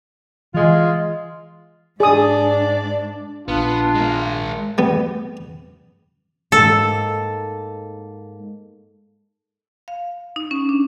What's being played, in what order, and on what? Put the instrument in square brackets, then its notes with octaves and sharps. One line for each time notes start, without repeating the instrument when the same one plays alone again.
[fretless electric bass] E3 [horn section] G#3 F4
[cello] G#2 D4 [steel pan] G#4 D#6 [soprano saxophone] D5
[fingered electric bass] A#1 [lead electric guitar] B3 [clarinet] D4 [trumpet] F4
[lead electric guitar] G#3 A#4
[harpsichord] G3 B3
[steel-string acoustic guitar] G#2 A#3 [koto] A4
[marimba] F5
D#4
C#4
D4